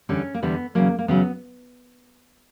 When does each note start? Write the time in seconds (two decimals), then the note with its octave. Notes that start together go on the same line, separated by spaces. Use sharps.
0.09 E2 D3 G3 C#4
0.34 A#3
0.42 E2 D3 G3 B3
0.75 E2 C#3 F#3 A#3
0.99 A#3
1.08 E2 C#3 F#3 B3